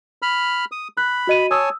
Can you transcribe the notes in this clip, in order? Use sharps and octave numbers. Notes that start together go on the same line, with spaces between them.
B5 F6
D#6
B5 F#6
F#4 D#5 D#7
C#5 G#5 A5 D#6 E6